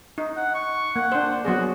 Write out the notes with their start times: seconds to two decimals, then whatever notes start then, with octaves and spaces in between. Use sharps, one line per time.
0.18 D#4
0.37 F#5
0.55 C#6
0.96 A#3 F#5
1.12 D4 C5
1.45 F#3 B3 F#4 G#4